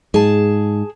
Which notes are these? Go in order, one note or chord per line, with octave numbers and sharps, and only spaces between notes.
G#2 G#4 A5